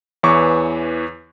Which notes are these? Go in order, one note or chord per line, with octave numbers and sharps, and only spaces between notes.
E2 E3 C#5 C#6 D6